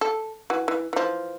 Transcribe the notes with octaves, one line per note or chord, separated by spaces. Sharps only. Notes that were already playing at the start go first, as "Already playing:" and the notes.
A4
E3 F#4
E3
E3 F3